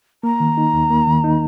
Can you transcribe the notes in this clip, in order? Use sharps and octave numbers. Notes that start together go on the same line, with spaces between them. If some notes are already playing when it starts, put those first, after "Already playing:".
A#3 A#5
D#3
D#4
D#2
A#3
D#3
D#4